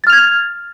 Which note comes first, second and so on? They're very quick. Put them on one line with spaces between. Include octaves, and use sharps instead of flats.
A6 F6 F7 G#6